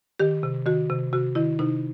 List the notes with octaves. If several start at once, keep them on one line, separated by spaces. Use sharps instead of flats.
D#3 G4
C3
D#3 F#4
C3
C3 F#4
D#3 E4
C3 D#4